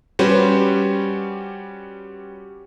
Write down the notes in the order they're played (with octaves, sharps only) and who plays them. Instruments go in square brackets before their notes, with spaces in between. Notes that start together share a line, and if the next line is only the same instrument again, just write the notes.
[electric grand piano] G3 C#4 F#4 G4 B4 C5